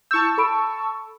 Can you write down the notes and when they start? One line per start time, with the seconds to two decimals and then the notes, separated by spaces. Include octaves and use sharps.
0.11 E4 A5 C#6 E6 G6
0.38 A4 B5 D7